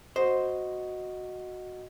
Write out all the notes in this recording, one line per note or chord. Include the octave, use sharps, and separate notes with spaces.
F#4 C5 D#5